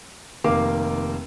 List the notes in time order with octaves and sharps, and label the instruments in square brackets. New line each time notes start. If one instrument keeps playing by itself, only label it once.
[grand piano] F1 D#3 A#3 F5 D6